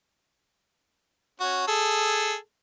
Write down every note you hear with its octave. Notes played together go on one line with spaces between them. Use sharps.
C#4 F#4
G#4 A4